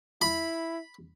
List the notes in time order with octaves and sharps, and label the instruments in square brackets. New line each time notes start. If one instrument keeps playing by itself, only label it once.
[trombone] E4 [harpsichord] B5